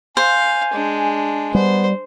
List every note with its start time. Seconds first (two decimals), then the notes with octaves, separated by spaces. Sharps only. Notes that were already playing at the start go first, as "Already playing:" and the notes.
0.17 C5 F5 G#5
0.73 G#3 D4
1.55 G3 B3 C5